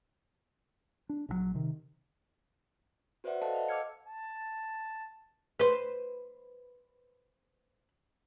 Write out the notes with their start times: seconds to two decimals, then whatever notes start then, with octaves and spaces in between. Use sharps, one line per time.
1.09 D4
1.29 A#1 C#3 F#3
1.55 C3 D#3
3.24 F#4 B4 C5 D5 E5 F#5
3.42 A4 C5 D#5 F5 F#5 A5
3.55 D#5 F5
3.68 D#5 D6 E6 F6 G#6 C#7
4.07 A5
5.59 B4 C5